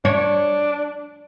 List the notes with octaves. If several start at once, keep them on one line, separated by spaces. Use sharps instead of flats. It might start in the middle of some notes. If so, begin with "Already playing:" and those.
D4 C#5